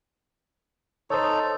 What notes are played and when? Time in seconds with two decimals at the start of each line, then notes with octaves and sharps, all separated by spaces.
1.10 D#4 A4 C5 C#5